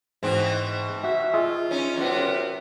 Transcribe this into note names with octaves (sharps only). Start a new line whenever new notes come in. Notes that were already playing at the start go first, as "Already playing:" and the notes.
G#2 B2 E3 C4
F#4 E5
F4 G#4 D#5 E5
C#4 D#4
F#2 C3 B3